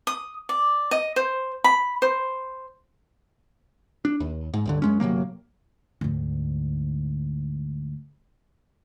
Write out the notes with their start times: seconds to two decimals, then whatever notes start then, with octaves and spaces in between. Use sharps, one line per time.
0.07 D#6
0.49 D5
0.91 D#5
1.16 C5
1.64 B5
2.02 C5
4.05 D4
4.20 D#2
4.54 G#2
4.66 C#2 G2 D3
4.82 F#2 G#3 C#4
5.00 G1 C3 F#3 A#3
6.01 D2 G#2